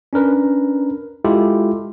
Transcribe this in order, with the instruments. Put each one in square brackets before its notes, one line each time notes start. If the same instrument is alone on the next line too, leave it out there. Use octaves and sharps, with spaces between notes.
[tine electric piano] C#4 D4 A#4 B4
G#3 E4 F4 G4 A4